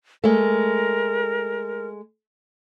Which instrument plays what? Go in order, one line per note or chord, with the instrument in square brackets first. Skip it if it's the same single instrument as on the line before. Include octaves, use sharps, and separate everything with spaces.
[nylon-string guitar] G#3 A3 [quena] A#4